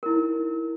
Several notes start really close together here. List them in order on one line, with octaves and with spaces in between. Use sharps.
A#4 E4 D#4